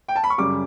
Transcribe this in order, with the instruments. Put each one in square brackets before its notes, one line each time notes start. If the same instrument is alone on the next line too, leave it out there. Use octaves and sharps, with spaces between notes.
[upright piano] G5
A5
B5
C#6
F#2 C#3 G3 D6